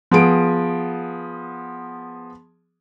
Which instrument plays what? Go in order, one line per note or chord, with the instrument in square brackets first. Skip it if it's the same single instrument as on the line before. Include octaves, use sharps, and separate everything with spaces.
[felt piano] F3 B3 G#4 D7